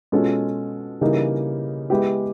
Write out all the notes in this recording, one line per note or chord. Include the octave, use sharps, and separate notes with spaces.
B2 G#3 C#4 F4 A4
C#3 E3 G3 A#3 D#4
G#3 B3 E4 G4